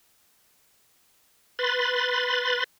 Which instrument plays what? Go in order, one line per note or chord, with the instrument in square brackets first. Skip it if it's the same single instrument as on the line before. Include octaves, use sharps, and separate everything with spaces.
[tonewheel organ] B4 B5 C6 A6